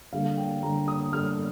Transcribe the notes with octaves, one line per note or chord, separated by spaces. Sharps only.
D3 G3 A#3 F5
G5
D3 G3 A#3 A#5
D#6
D3 G3 A#3 F6